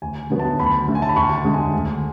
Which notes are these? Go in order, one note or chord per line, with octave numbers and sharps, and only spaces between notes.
D2 G#5
D3 F#3 B3
A5
D2 B5
D3 A3
G#5
A5
B5
D2 C#6
A5
D3 G#3
G#5
D2